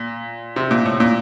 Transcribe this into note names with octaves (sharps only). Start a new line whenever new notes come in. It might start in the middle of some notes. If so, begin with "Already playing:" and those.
Already playing: A#2
C3
A#2
A2
A#2